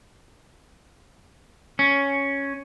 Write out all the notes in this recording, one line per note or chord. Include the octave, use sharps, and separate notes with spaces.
C#4